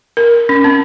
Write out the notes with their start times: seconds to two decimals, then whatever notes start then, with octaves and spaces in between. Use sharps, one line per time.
0.17 A#4
0.49 C#4
0.64 C4